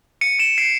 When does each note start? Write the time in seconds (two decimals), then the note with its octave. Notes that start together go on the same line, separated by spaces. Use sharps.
0.21 C#7 D#7
0.39 D7 E7
0.58 C7 D7